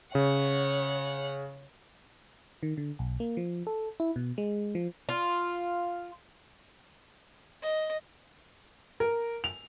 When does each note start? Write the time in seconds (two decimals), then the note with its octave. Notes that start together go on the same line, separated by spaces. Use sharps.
0.15 C#3 C#5 F#5
2.63 D#3
2.77 D3
2.99 B1
3.20 A#3
3.37 F3
3.67 A4
4.00 E4
4.16 B2
4.38 G#3
4.75 F3
5.09 F4
7.63 D#5
9.00 A#4
9.44 F7